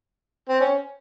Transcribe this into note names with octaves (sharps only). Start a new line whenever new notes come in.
C4
C#4